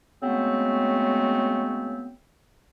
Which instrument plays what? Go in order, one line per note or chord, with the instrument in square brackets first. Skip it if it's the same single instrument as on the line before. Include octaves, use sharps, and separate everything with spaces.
[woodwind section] C#3 F#3 G#3 A3 B3 C4